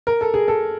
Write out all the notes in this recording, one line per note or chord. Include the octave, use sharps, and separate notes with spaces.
A#4
A4
G#4
A4